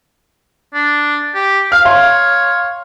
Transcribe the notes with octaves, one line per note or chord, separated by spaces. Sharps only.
D4
G4
F5 F6
C#5 F5 C6